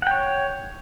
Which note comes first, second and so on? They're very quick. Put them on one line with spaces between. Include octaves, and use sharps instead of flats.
F#5 G5 C#5